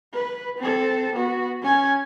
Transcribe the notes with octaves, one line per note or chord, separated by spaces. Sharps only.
B4
C4 A4
B3 F#4
C#4 G#5